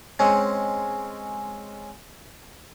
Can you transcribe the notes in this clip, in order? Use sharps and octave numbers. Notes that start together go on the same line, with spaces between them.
G#3 C4 C#4